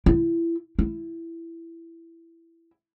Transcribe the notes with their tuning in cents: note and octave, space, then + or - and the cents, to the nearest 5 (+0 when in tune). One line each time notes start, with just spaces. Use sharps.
E4 +25
E4 +10